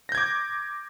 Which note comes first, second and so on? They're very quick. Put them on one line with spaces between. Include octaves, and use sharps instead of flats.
A#6 G6 G#6 D6